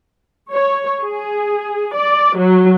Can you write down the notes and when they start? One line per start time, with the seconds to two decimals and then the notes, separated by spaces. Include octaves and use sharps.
0.52 C#5
1.01 G#4
1.94 D5
2.38 F#3